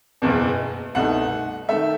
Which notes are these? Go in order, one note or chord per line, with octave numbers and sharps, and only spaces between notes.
F#1 E2 B2
C2 B2 A3 D#4 F#5
D#3 A3 E5